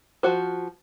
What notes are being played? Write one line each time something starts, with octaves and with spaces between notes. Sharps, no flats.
F3 F4 F#4 C5